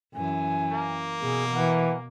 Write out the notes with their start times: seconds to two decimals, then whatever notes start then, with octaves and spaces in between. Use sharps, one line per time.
0.14 F#2 E3 G#5
0.72 A#3
1.21 B2 G#4
1.53 E3 F#5